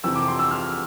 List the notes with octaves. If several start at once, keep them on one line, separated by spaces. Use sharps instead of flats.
F2 C3 E3 E6
D6
C6
E6
F6